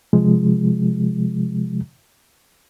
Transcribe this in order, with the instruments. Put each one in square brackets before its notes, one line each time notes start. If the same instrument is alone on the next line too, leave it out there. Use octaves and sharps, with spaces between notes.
[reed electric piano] C3 F3 G#3